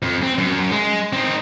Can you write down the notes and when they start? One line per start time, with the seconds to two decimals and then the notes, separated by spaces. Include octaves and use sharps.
0.02 F2
0.23 C4
0.38 F#2
0.71 G#3
1.13 C4 D#4